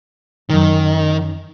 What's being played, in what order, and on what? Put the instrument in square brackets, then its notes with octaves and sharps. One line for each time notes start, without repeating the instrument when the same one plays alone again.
[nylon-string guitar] F#2 D#4 [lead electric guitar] D#3